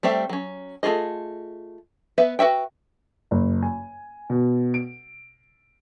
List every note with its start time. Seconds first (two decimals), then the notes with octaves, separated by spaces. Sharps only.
0.03 G3 A3 C4 G4 E5
0.29 F#3 C#4
0.83 A3 D4 F4 G#4 D#5
2.18 B3 B4 E5
2.39 F#4 B4 E5 G5
3.31 F#1
3.63 G#5
4.30 B2
4.74 D7